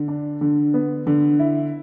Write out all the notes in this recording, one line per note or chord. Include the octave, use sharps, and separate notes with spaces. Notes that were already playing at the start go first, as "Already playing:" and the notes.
Already playing: D3
D4
D3
B3
D3
E4